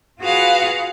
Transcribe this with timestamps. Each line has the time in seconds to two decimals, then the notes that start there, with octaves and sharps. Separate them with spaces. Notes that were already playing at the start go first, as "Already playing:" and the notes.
0.21 F4 F#4 G#4 B4 F5 F#5